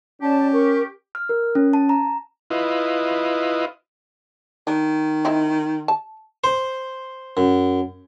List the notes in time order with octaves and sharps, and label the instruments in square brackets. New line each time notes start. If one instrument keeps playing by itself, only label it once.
[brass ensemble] C#4 [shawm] G4 [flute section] D5 A5
[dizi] A#4 [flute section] C#6
[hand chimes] F6
A#4
C#4
A5
A#5
[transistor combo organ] E4 F4 B4 D#5
[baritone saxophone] D#3 [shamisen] D4
[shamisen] C4 D#4 E4
A5
[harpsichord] C5
F#2